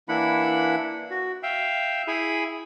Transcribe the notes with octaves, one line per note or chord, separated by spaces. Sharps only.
E3 A#3 D4 E4 F#5 B5
F#4
E5 F5 G5
E4 G#4 G#5 B5